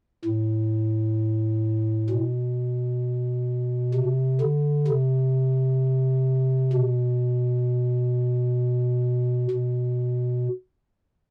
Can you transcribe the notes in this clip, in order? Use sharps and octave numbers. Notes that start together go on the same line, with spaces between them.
A2
B2
C3
D3
C3
B2
B2